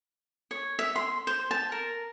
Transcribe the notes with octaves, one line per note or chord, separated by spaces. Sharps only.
C#5
E5
C6
C5
A5
A#4